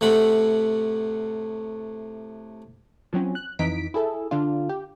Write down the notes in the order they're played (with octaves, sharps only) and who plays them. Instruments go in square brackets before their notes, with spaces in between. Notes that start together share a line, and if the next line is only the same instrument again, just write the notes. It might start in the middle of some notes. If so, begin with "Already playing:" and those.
[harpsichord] A2 C3 A3 F#5 B5
[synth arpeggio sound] F3 F#3 C4 C#4
F#6
F2 E3 D#4 B6 D7
E4 G#4 A4
D3 D4 F4
G4